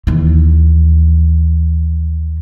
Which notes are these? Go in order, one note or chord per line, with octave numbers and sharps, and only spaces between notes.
D#2 E3